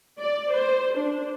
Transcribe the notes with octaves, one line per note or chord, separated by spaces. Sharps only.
D5
C5
D4